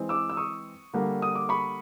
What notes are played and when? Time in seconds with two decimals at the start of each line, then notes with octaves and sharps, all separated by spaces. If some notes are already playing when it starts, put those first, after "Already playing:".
Already playing: E3 G#3 C4
0.09 D6 E6
0.30 E6
0.37 C#6 D#6
0.93 D3 G3 A#3
1.22 D#6
1.35 D6
1.49 B5 C#6